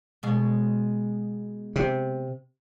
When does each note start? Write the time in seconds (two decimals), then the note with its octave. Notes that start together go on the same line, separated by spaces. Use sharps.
0.23 B2 G#3
1.76 C3